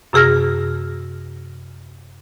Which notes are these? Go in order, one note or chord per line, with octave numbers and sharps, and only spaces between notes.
F#2 C3 G#4 F6 A#6